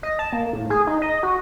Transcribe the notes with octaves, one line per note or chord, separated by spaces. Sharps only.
D#5
A5
A#3
A2
G#4
D#4
D#5
F#4